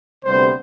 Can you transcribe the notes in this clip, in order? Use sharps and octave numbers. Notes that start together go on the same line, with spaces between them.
D2 C3 G3 B3 C5